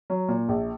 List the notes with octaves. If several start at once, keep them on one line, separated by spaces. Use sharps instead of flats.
F#3
A#2
A#1